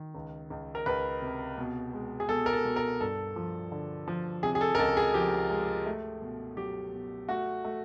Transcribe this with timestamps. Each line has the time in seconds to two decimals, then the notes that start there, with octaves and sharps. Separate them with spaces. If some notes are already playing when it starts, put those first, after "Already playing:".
Already playing: D#3
0.15 C#2
0.50 C#2
0.75 A#4
0.86 C#2 B4
1.22 C3
1.58 B2
1.93 G#3
2.20 G#4
2.29 B2 A4
2.46 A#4
2.53 A4
2.65 B2
2.76 A#4
3.01 G2 A4
3.36 F3
3.72 D3
4.08 F3
4.43 C3 G#4
4.55 G#4
4.61 A4
4.75 A#4
4.79 C#2 A4
4.97 G#4
5.14 F3 G4
5.51 G#3
5.86 A3
6.22 B2
6.57 F#3 G4
6.93 B2
7.29 A3 F#4
7.64 A3